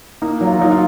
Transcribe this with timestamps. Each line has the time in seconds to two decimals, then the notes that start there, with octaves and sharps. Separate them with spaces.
0.22 A#3 D#4
0.41 F#3
0.47 F4
0.59 F#3 D#4
0.72 F4